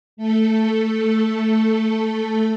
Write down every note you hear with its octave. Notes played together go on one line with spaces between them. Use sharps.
A3 A4